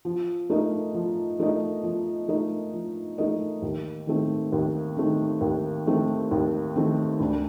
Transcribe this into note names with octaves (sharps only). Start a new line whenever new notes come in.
F3
A3 D#4 A#4 D#5
F3
A3 D#4 A#4 D#5
F3
A3 D#4 A#4 D#5
F3
A3 D#4 A#4 D#5
D#2
D#3 A3 C4
D#2
D#3 A3 C4
D#2
D#3 A3 C4
D#2
D#3 A3 C4
D2